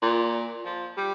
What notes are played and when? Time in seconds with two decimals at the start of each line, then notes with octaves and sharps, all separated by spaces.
0.02 A#2
0.65 F3
0.97 G3